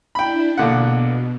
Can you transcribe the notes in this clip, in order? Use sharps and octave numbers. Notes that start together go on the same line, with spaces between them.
D4 E4 G5 B5
A#1 B2 D3 F#5